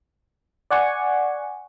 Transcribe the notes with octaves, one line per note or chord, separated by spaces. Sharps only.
D5 F#5 G#5 C#6